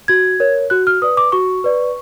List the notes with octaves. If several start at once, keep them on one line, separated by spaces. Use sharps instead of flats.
F#4 G#6
A#4 C#5
F#4 F#6
F6
B4 D5 D#6
D6
F#4 C#6
B4 D5